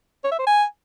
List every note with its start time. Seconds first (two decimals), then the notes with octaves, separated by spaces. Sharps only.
0.24 C#5
0.32 E5
0.39 C5
0.47 G#5